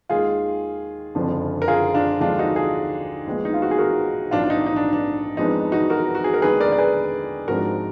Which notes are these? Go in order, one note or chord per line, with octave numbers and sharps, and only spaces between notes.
D#2 D#3 G#3 F4 G#4
F#1 F2 D3 F3
A#4
F4 G#4
D4 F4
D#2 D3 F3 G#3 D4 F4
D#4 F#4
F4 G#4
A#1 A#2 G#3 B3
D#4
F4
F#4
G#4
F#4 A#4
A#1 G#2 D#3 F#3 D4 F4
D4
D#4
D#4
D4
D4
F2 F3 G#3 B3 D4 D#4
D#4 F#4
F#4 A#4
F#4
G#4
A#4
D#2 D3 G#3 B3 G#4 B4
A#4 D5
D5
G#4 B4
G#1 G#2 F3 G#3 D4 F#4 A#4